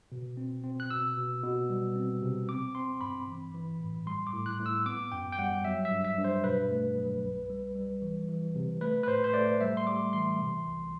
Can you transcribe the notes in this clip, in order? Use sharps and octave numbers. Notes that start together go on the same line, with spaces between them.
B2
C4
C4
F#6
B2 E6
B2
B2
G3
C4
C3
C4 D6
C4 C6
G2 B5
E3
E3
A2
G3 C6
D6
A2
F#6
A2
E6
B3 D6
F#2 G5
G5
G3 F#5
F#3 E5
E5
G2
E5
G2
C5
B2 B4
A3
F#3
C2
G3
G3
E3
E3
C3
A3 B4
B4
A2 C5
C5
A3 D5
G3 E5
C6
G3 D6
E3 C6
C3
C2